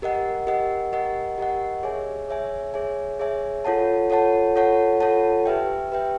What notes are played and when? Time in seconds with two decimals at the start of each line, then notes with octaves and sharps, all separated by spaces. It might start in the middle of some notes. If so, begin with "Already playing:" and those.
0.02 G4 A#4 D#5 F#5
0.47 G4 A#4 D#5 F#5
0.93 G4 A#4 D#5 F#5
1.38 G4 A#4 D#5 F#5
1.83 G#4 C#5 E5 G#5
2.28 G#4 C#5 E5 G#5
2.74 G#4 C#5 E5 G#5
3.19 G#4 C#5 E5 G#5
3.65 F4 A4 C#5 F#5 A5
4.10 F4 A4 C#5 F#5 A5
4.56 F4 A4 C#5 F#5 A5
5.00 F4 A4 C#5 F#5 A5
5.46 G4 B4 E5 G5
5.92 G4 B4 E5 G5